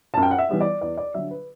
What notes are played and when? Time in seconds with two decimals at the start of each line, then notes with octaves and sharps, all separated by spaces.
0.14 A5
0.17 F#2
0.23 G5
0.31 F#5
0.39 E5
0.49 E3 G3 B3
0.61 D5
0.81 E2 D5
0.97 D5
1.14 D3 F#3 E5
1.31 B4